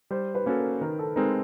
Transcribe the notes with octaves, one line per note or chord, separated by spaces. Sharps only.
G3 C5
B4
A#3 C#4 F#4 A4
A#4
D#3 A#4
A4
G#3 C4 D#4 A#4